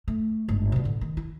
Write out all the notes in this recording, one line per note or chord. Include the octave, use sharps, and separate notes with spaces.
A3
G1 G#2
B2 G3
A2 D3
D#3
E4